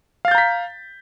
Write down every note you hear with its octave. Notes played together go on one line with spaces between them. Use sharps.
F5 A#5 G6 A6 B6